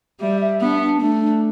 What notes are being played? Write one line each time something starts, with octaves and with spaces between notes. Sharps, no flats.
G3 E5
E5
B3 D4
D4
A3 D4
D4